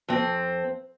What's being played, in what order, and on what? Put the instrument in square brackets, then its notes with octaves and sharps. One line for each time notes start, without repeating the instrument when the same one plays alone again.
[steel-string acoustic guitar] F2 C4